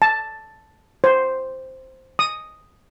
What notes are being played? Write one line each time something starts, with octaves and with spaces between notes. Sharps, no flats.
A5
C5
D#6